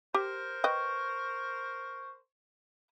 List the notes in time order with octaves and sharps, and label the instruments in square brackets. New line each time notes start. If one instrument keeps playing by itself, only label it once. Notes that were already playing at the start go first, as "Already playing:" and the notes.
[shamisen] G4 [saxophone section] A#4 C5
[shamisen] B4 D#5 G5 [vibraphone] C#6